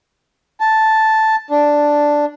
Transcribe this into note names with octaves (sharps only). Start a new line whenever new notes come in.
A5
D4